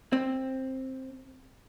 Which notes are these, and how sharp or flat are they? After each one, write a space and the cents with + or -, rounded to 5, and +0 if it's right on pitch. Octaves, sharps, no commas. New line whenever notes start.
C4 +10